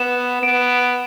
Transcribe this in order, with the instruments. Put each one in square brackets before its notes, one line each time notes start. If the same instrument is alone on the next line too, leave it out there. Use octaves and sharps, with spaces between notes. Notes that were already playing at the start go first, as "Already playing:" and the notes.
Already playing: [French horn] B3 [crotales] E7
[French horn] B3 [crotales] D7
[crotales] E7